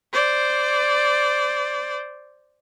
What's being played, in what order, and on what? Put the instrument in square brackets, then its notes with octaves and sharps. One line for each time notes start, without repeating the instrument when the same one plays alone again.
[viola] C5 D5